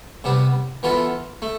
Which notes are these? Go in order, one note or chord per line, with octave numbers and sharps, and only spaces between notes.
C3 G3 B3
E3 B3 F4 A4
A3